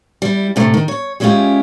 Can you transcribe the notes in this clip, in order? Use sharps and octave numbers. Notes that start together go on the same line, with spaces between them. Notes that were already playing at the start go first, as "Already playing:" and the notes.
G3 E4
A2 C3 A3
D#3
C#5
G3 G#3 C#4 E4 F4 G4